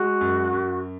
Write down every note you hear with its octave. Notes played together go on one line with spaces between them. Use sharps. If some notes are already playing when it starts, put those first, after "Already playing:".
Already playing: G#3 F#4
F#2
F#2